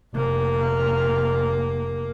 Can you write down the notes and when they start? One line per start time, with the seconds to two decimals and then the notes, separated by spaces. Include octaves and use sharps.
0.14 F1 A#3